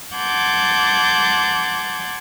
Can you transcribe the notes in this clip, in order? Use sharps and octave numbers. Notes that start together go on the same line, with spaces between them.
F#5 A5 C6 D6 G6 G#6